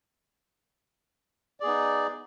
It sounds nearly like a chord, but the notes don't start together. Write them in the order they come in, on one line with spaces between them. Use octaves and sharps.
D5 G#4 B3 D#4